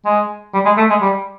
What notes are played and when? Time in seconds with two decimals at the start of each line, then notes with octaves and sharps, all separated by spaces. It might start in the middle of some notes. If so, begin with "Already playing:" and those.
0.05 G#3
0.54 G3
0.65 G#3
0.77 A3
0.90 G#3
1.02 G3